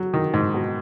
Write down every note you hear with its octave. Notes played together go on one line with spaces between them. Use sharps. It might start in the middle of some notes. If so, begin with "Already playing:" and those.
Already playing: F#3
D#3
G#2
B2